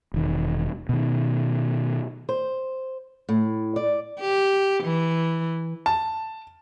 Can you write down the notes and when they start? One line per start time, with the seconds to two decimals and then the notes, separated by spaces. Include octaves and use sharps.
0.14 E1 D#3
0.89 B2 D#3
2.29 C5
3.29 A2
3.76 D5
4.21 G4
4.84 E3
5.86 A5